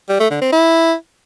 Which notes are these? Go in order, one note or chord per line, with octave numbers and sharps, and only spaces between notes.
G3
A3
D3
C4
E4